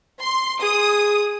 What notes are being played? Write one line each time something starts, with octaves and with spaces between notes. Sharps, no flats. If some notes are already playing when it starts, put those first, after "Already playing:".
C6
G#4 D#6